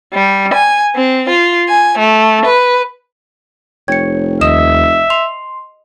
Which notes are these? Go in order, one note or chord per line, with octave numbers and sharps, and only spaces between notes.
G3
G#5
C4
F4
G#5
A3
B4
F1 C#5 G5 G#6 C#7
D#2 D#5 E5 D#6 E7
C6 F7